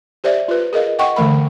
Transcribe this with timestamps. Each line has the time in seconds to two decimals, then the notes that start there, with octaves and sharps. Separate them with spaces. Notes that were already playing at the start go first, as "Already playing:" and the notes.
0.24 G4 C5 D5 E5
0.48 F4 B4
0.73 G#4 A#4 D#5 F5
0.99 D#5 F#5 G5 C#6
1.16 D3 E3 A3 A#4 B5